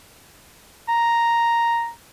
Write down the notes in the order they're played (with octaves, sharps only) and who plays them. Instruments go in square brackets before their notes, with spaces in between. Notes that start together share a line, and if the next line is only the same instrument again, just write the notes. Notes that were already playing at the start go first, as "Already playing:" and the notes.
[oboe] A#5